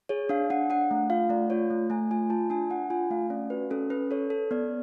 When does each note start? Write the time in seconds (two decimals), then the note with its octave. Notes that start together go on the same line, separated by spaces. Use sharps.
0.09 G#4 C#5
0.29 D4 F5
0.50 D4 F#5
0.70 D4 F#5
0.91 A3
1.10 F4 F5
1.30 A3 D5
1.50 F4 C#5
1.70 A3
1.90 A3 G#5
2.11 F4 G#5
2.30 F4 A5
2.50 D4 G#5
2.70 D4 F#5
2.90 F4 G#5
3.11 A3 F5
3.30 C#4 D5
3.50 F#4 B4
3.71 C#4 A4
3.90 C#4 B4
4.11 A4 C#5
4.30 A4
4.51 B3 D5